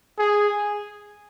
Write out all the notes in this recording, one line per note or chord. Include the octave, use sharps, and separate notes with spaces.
G#4